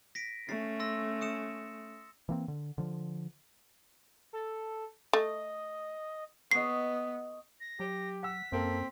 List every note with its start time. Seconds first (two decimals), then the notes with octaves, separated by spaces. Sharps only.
0.15 A#6 B6 D7
0.49 A3 C#4 A6 C7
0.80 C6 E6 A#6
1.21 D#6 C#7 E7
2.29 E3 A#3 C4
2.48 D3
2.78 D3 F3
4.33 A4
5.13 A3 D#5
6.51 B3 D#5 C#6 C7
7.60 A#6
7.80 F#3 G4
8.23 F#5 E6 B6
8.52 F#2 A#3 C4 A4